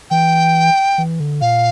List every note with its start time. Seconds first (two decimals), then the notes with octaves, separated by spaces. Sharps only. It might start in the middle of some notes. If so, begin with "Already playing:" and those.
0.10 E3 G5
0.98 E3
1.20 D3
1.41 A#2 F5